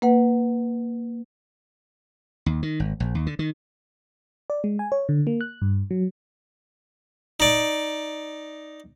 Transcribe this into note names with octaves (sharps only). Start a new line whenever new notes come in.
A#3 B4 F#5
D#2
D#3
G#1
A#1
D#2
D3
D#3
D5
G#3
G#5
C#5
D3
A#3
F#6
G2
F#3
D#4 D5